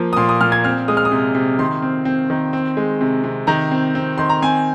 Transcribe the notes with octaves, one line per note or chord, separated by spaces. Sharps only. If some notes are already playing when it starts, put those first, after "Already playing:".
Already playing: F3 A#3
D#6
A#2 C6
D#6
A#2 F6
G#6
C4 F6
G#3 D#6
F6
D#6
C3
C3
D#3 C6
C4
C4
D#3
C4
G#3
C3
C3
D#3 A#5
C4
C4
D#3 C6
A#5
C4 G#5